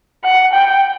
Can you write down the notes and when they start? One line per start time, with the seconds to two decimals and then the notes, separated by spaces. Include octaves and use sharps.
0.25 F#5
0.53 G5